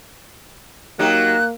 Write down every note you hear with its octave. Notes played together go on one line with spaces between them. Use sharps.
F#3 A#3 D#4 G4 F#6